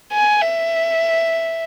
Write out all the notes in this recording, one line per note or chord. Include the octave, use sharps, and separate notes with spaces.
G#5
E5